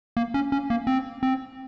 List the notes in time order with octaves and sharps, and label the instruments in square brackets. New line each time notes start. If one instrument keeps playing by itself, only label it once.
[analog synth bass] A#3
C#4
C#4
A#3
C4
C4